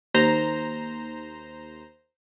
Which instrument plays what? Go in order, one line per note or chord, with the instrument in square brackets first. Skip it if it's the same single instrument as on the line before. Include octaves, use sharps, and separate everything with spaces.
[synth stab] D#2 C5 A#5